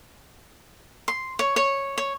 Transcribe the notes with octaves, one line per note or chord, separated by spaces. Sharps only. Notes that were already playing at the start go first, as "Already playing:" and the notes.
C6
C#5
C#5
C#5